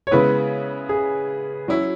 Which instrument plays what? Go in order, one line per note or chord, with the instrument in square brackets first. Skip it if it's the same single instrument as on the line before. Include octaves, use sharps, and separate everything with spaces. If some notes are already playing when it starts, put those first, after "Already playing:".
[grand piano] C#5
[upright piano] C#3 G#3 B3 E4 [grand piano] B4
[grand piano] G#4
[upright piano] F#3 C#4 E4 [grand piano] F#4